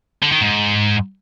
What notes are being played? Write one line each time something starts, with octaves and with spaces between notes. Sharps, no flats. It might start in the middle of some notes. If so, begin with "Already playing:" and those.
D3
D#3
G#2